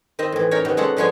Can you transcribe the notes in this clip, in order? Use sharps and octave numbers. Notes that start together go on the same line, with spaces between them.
D#3 C4 D#5 E5
A2 E3
C#4 D#4 A#4 C#5
C3 D#3 B3
G#3 C#4 A4 F#5
D3 F3 G#3 B3 C#5 G#5